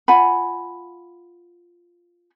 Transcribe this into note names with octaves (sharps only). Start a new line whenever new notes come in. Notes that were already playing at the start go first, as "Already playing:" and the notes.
F4 F#5 G#5 B5